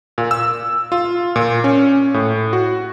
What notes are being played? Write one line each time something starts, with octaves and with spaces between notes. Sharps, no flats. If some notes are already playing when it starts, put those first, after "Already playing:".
A#2
E6
F4
A#2
C#4
A2
F#4